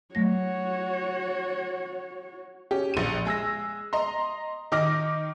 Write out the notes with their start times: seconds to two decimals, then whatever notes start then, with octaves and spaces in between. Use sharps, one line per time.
0.15 F#3 A3 F#4 C#5 A#6
2.71 C#4 G4
2.94 A#1 D#7
3.25 G#3 G#4 E6 A#6
3.93 D#5 A#5 C6
4.72 D#3 D#4 D6 F6 A#6